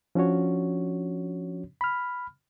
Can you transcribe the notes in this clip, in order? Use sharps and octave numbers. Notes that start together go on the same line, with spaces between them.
F3 C#4 D4 F#4 C#5
B5 F6